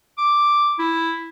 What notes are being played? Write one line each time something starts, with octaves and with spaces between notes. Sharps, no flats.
D6
E4